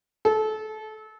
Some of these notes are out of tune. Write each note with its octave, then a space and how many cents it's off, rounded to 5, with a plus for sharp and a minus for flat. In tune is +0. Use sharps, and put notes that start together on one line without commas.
A4 -25